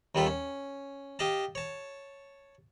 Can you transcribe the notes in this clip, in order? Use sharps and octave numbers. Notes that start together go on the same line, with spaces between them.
D#2 D#3 G3 F4 A4 E5
C#4
G4 D#5 F5 A5
C#5 A5